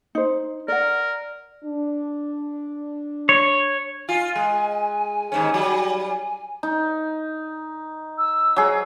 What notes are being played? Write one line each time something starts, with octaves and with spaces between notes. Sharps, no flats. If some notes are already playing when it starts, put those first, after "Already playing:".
D#4 C5
A#4 D5 F#5
D4
C#5
F4 G#5
G#3
D#2 G#2 C#4
F#3 G3
D#4
E6
F#3 G#4